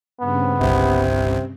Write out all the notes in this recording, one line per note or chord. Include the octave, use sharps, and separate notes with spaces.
G2 C#3 B3 C4
G1 C2 C3